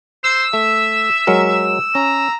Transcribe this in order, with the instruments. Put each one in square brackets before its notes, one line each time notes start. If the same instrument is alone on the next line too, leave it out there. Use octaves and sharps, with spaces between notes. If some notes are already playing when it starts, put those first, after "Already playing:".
[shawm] C5 [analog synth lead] E6
[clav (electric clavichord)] A3 [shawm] E5
[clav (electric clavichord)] F#3 G#3 A#4
[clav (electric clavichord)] C#4 [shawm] A#5